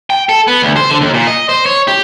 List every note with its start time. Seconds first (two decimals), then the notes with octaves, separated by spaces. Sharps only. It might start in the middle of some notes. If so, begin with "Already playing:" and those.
0.10 G5
0.29 A4
0.47 B3
0.62 D2
0.76 C5
0.89 D3
1.01 D#2
1.14 A#2
1.27 D#5
1.49 C5
1.66 C#5
1.88 G4